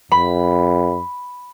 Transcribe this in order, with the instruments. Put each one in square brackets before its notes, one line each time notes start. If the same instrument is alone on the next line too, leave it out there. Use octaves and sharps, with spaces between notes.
[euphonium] F2 [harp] B5